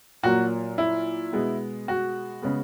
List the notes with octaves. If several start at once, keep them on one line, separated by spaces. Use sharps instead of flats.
A#2 F#3 A#3 F#4
E4
B2 G#3 B3
F#4
C#3 G#3 B3